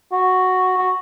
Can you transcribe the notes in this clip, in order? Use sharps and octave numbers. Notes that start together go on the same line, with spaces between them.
F#4
F#4